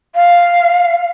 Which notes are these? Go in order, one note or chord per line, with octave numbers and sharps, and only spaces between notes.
F5